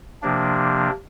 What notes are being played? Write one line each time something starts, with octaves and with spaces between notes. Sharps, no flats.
C3 F3 A#3 D4